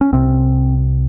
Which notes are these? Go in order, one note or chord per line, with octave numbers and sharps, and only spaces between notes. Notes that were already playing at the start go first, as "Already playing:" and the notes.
C#4
C2 C3 C4